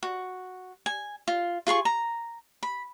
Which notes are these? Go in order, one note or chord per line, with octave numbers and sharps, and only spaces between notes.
F#4
G#5
F4
F4 G#4 C6 C#6
A#5
B5